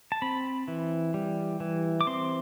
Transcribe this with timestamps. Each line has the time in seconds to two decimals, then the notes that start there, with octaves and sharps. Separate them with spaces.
0.12 A5
0.22 C4 B5
0.68 E3
1.14 G3
1.60 E3
2.01 D6
2.07 C4 C6